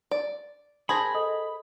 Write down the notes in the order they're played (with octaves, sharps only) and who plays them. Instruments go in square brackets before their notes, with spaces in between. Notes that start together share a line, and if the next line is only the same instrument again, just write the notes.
[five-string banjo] D5
[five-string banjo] G#4 A#4 C5 [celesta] A5 G#6 A#6 [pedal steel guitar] B5
[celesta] A4 D#5 D#6